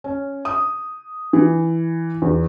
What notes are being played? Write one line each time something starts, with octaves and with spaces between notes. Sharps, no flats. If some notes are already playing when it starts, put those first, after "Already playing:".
C#4
D#6
E3
E2